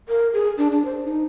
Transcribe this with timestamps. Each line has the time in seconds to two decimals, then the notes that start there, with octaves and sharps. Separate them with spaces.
0.09 A#4
0.33 G#4
0.58 D4
0.71 D4
0.85 C5
1.05 D#4